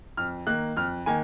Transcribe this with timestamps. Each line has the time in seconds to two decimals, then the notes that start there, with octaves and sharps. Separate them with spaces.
0.17 F2 F6
0.47 D#3 A#3 F#6
0.76 F2 F6
1.06 D#3 A#3 G#5